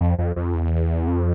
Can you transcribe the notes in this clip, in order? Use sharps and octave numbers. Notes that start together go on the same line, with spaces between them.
F2
F2
F2
E2
F2